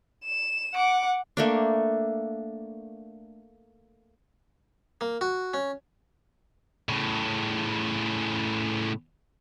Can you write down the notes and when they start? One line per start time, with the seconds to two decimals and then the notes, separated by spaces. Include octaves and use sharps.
0.25 E7
0.74 F#5 D6
1.37 A3 A#3 D4
5.01 A#3
5.21 F#4
5.54 C#4
6.89 A2 C#3